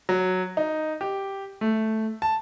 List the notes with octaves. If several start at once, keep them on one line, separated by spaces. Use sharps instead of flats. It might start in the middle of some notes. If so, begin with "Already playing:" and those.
F#3
D#4
G4
A3
A5